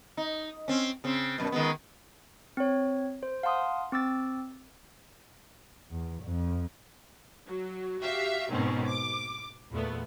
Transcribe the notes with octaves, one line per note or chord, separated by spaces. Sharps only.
D#4
C4 C#4
C#3 C4
F#2 B2
D#3 G#3 B3
C4 C#5
C5
F5 F#5 A5 C6 D#6
C4 D6 E6 A6
E2
F2
F#3
F#4 G4 E5 F5
G#2 B2 D#3 C4 C#4
D6
E2 A#2 A3 B3